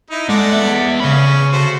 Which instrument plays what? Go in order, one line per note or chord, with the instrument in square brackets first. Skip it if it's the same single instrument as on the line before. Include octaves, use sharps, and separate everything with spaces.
[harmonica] D#4 E4
[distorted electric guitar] G#3 [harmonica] A4 D5 F#5
[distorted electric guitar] B3 E5
[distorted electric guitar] C#3 B5 [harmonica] C#4
[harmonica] A3 F#4 C5